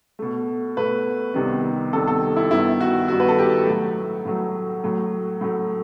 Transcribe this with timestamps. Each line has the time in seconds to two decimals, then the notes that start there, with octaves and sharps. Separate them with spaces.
0.19 B2 A3
0.77 B2 A3 B4
1.34 C2 C3 D#3 G3 B3
1.93 C2 C3 D#3 G3 B3 A4
2.07 A4
2.36 E4
2.51 G2 D#3 G3 B3 E4
2.80 F#4
3.08 G2 D#3 G3 B3 F#4
3.20 B4
3.28 A4
3.39 G4
3.67 A2 F#3 A3
4.25 A2 F#3 A3
4.84 A2 F#3 A3
5.41 A2 F#3 A3